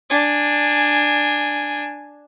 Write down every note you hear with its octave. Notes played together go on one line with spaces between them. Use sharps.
D4 G#5